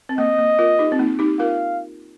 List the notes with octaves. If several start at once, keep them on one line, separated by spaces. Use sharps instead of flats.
C4
A#3 D#5
A#3
F4 A#4
D#4 G4
C4
A#3 D#4
D#4 G4
F4 A#4 F5